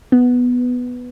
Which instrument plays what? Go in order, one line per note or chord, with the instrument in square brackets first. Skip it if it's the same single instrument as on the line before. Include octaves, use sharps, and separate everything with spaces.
[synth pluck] B3